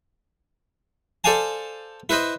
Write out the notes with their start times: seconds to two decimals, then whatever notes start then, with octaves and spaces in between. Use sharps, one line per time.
1.24 A4 C5 D5 F5 G#5 A5
2.09 E4 B4 C5 D#5 B5